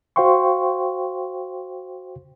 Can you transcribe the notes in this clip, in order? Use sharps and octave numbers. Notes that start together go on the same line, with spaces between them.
F#4 C5 F5 G5 C6 C#6